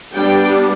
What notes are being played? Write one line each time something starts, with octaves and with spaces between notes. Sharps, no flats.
G3 B3 D4 G5